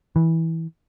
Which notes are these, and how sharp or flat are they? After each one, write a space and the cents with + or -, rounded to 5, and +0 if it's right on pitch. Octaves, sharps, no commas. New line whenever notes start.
E3 -15